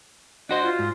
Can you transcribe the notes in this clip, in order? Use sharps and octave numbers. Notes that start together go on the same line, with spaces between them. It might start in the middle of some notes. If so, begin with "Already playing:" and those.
D4 F#4 C5 D#5
F4
G#2